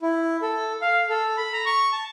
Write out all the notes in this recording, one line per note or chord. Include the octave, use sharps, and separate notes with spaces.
E4
A4
F5
A4
B5
A#5
C#6
A5